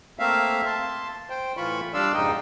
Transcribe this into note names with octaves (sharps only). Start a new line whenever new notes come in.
A3 A#3 C4 E5 F5
A5 C6
C5 G5
A2 E3 F4 B5 C#6
G3 D4 D5 F5 C6 E6
F2 G#2 C#3 D#4 D#5 G5